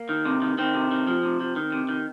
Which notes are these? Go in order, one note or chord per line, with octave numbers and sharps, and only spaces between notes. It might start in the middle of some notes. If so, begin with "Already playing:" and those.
Already playing: A#3
D#3
C3
D#3
D#3 C4
C3
D#3
F3
C3
F3
D#3
C3
D#3